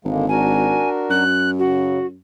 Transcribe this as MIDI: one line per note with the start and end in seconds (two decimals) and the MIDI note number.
0.05 0.85 32
0.05 0.26 50
0.05 0.26 56
0.05 0.26 58
0.29 1.24 62
0.29 1.24 66
0.29 1.24 70
0.29 0.89 80
1.10 2.18 42
1.10 1.50 90
1.59 1.99 49
1.59 1.99 54
1.59 2.06 66